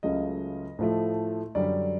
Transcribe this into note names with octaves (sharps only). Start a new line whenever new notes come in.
C#2 C#3 F#3 A3 C#4 D#5
A2 F3 A3
F#2 D3 G3 D5